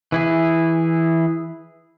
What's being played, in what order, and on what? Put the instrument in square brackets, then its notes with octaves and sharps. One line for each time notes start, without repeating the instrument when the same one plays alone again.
[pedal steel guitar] E3 E4 G#4